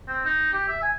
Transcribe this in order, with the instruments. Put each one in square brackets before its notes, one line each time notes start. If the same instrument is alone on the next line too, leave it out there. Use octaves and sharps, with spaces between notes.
[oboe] C4
D#4
G4
E5
G#5